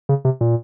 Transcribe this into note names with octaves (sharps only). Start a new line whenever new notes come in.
C#3
C3
A#2